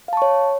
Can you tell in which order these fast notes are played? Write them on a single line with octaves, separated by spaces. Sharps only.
F5 A5 C#6 C#5